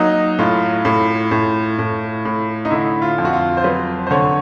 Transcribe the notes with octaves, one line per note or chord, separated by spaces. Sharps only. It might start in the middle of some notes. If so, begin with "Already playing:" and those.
Already playing: F#3 A#3 D#4
A2 F4
A2
A2
A2
A2
D#4
D3 E4
F4
F2
F#4
F4
C5
F#3 B4
C5
D3 C#5